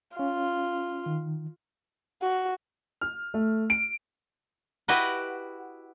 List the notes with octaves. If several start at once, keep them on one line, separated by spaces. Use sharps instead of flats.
C#4 F4 F5
D#3
F#4
F6
A3
D7
E4 F#4 G4 B4 D#5 F#5